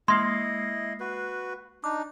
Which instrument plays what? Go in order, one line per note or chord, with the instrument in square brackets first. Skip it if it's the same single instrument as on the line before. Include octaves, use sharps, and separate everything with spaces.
[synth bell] G#3 A#3 C7 [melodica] E4 D#5 [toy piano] C6
[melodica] F#4 B4
[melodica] D4 D#4 [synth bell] D6